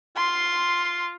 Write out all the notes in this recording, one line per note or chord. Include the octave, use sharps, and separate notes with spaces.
F4 C6